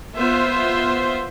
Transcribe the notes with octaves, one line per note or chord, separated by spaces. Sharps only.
B3 F4 C5 E5